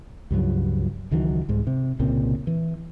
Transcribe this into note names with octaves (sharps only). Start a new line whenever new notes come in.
C#2 G2 F3 F#3
C#2 D#3 E3 F#3
C2 G#2 C3
C3
C2 A#2 C#3 C4
E3